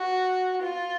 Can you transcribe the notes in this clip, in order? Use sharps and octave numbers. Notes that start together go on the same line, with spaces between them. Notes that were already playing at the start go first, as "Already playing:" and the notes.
Already playing: F#4
F4